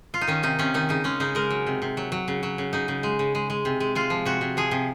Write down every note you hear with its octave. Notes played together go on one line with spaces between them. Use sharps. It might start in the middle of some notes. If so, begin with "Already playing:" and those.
F4
D#4
D#3 C#4
C3 D#4
C3 C#4
D#3 D#4
C#3 D#4
G#3 C#4
C#3 D#4
G#3 A#4
F#3
C3
C3
F#3
F#3
C#3
F#3
C#3
C#3 D#4
C#3
G#3
C#3
G#3
G#3
C3
G#3
G#3 F4
F3
C3 F#4
C3
F3 G#4
C3